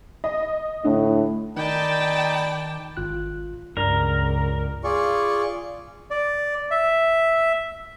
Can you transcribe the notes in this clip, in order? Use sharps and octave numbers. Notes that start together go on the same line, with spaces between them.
D#5
A2 D3
D#3 D#4 D5 G5 A5 B5
G#1 F4 F#6
C#2 G2 A#4 D5
F4 G#4 D5 C#6
D5
E5